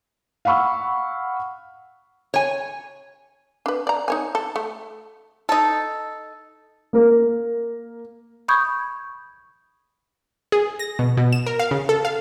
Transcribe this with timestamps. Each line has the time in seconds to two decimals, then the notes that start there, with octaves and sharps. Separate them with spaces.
0.45 F5 F#5 B5 C#6 E6
2.34 C#5 G#5
3.66 D4 B4
3.87 D5 A#5
4.08 D#4 C#5 G#5
4.35 A4
4.56 A3
5.49 D#4 A4
6.93 A#3 A#4
8.48 B5 C#6 D#6 G6 G#6
10.52 G#4
10.79 A#6
10.99 B2
11.17 B2
11.33 E7
11.47 A#4
11.59 F5
11.71 C#3
11.89 A4
12.05 F5